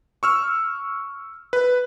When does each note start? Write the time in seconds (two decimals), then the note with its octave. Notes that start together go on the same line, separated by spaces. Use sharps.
0.23 C#6 E6 F6
1.53 B4